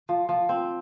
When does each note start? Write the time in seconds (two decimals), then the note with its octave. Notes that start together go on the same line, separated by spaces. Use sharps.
0.09 F3
0.29 F3
0.49 C4